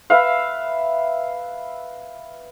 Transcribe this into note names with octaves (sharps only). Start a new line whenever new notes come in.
B4 E5 F5